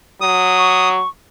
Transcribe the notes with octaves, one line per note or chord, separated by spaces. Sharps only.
F#3 D#6
C#6